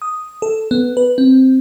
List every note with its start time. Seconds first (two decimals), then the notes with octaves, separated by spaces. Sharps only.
0.02 D#6
0.42 A4
0.71 B3
0.97 B4
1.18 C4